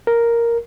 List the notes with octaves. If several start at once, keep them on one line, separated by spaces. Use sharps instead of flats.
A#4